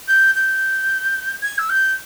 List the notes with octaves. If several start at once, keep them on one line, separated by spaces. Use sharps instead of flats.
G6
G6
G#6
E6
G6